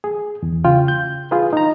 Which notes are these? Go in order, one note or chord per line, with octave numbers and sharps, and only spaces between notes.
G#4
E2
C#3 F4 G5
G6
F4 G#4 B4
D#4 A#5